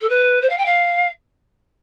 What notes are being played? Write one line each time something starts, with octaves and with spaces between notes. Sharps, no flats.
A4
B4
C5
F5
G5
F5